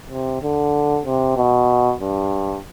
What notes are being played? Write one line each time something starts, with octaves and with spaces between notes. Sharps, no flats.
C3
D3
C3
B2
G2